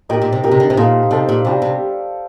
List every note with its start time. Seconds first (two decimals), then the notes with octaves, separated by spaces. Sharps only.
0.09 A#2 D#4 G4 A#4
0.22 A#2
0.32 C3
0.43 A#2 D#4 G4 A#4
0.51 C3
0.60 D3
0.70 C3
0.77 A#2 D#4 A4 C5 F5
1.11 C3 D#4 A4 C5 F5
1.29 A#2
1.45 C3 G3 D4 G4
1.62 C3